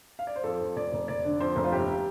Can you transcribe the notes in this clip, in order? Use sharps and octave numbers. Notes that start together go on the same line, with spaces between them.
F5
D5
C5
F2 A4
F2
F1 D5
F1
F1 D5
D3
F2 C5
F1
F4
G1 G4